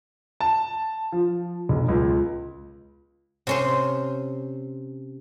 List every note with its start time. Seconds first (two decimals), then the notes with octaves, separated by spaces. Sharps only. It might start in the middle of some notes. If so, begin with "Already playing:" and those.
0.41 A5
1.12 F3
1.69 B1
1.88 C#2
3.47 C3 C#4 C5